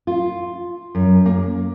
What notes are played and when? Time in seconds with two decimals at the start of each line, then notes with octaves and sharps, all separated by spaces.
0.07 F4
0.95 F#2
1.26 A#3